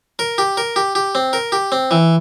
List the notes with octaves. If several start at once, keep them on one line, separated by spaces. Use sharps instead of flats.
A#4
G4
A#4
G4
G4
C4
A#4
G4
C4
E3